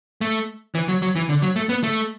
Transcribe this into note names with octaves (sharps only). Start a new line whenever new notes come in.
A3
E3
F#3
F#3
E3
D3
F#3
A3
B3
A3